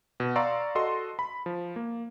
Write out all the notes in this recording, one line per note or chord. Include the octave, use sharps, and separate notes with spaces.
B2
D5 F5 A#5 C6 C#6 E6
F#4 A4 D#5 C6
B5
F3
A#3